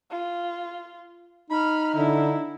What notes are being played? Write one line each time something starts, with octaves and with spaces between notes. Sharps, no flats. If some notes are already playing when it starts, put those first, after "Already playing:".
F4
D#4 B5 F6
D3 E4